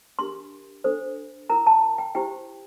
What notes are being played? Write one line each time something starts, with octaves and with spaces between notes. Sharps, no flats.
D4 G4 A#4 C6
D4 A4 C5
E4 A#4 A#5
A5
G5
E4 G4 C5 G5